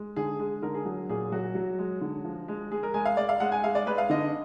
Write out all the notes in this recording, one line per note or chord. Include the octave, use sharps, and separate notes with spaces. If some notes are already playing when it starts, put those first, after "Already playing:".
Already playing: G#3
D3 G#4
G#3 G#4
D3 A#4
G#4
F#3
A#2 G#4
F#3 F#4
F#3
G#3
D3
F3
G#3
G#3 G#4
A#4
G#3 G#5
F5
G#3 D5
F5
G#3 F#5
G#5
G#3 F5
D5
G#3 B4
F5
D3 D#5